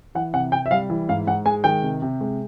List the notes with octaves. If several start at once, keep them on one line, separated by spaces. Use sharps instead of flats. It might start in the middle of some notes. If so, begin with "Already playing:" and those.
E3 F#5
C3 F#5
C3 G5
E5
G3 F5
E3
G#2 F5
G#2 F#5
G#3 G#5
D#3 G5
C3
C3
G#3